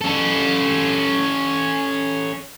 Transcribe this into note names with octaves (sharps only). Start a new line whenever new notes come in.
C#4 A4